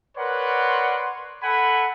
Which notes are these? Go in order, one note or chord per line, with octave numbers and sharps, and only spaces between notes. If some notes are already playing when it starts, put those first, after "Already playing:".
A#4 B4 C#5 D5 F#5 C6
A4 F#5 G#5 B5